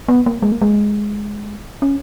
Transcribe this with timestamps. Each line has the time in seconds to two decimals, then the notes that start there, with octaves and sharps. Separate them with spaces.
0.08 B3
0.26 A#3
0.42 G#3
0.52 A#3
0.62 G#3
1.82 C#4